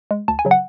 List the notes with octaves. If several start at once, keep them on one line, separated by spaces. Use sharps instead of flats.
G#3
D2 A5
G#5
C#3 F#3
F#5